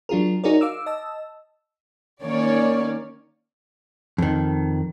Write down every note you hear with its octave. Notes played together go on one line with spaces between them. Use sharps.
F#3 D4 F4 G#4 A#4
D#4 F#4 G#4 A#4 C#5 D5
F5 D6 E6
D#5 A5 E6
D#3 A#3 C#4 C#5 D5
F2 D#3